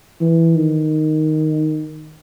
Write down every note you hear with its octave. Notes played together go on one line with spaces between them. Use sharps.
E3
D#3